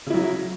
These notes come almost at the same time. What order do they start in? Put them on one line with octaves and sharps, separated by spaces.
C#3 E4 F#3